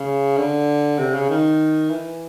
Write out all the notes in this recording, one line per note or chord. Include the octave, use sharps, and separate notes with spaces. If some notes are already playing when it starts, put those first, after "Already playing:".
Already playing: C#3
D3
C3
C#3
D#3
E3